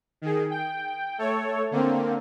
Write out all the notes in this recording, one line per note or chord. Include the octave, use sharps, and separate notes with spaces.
D#3 G#4
G5
A3 A4 C#5
D3 A#3 C4